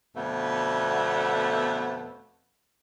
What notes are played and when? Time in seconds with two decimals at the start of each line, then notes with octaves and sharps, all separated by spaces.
0.16 F2 B2 D3 A3 B3